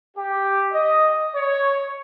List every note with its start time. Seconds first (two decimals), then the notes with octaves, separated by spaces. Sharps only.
0.16 G4
0.73 D#5
1.34 C#5